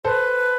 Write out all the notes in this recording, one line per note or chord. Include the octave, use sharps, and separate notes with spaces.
A4 B4 C5